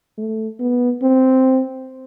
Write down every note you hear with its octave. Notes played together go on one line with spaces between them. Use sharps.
A3
B3
C4